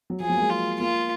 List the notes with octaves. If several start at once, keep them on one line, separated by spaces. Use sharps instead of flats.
F#3
F3 G#4
F#3
A#3
G#3
F4
A#3 F4